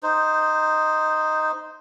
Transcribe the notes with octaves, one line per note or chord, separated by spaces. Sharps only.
D#4 C5